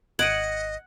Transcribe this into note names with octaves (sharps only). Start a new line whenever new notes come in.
G#1 D#5 F#5 G#6 D7 D#7